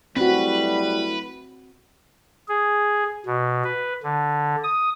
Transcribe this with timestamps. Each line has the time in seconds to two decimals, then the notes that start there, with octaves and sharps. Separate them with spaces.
0.16 F#3 G3 A3 C4 E4 F#4 B4
2.48 G#4
3.26 B2
3.64 B4
4.03 D3
4.63 D#6